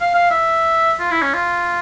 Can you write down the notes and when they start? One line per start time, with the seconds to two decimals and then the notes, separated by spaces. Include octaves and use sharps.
0.01 F5
0.15 F5
0.30 E5
0.99 F4
1.11 E4
1.22 C#4
1.34 F4